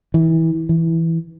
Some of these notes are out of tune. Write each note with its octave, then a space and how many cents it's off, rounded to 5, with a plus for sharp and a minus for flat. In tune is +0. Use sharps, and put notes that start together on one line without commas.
E3 -25
E3 -5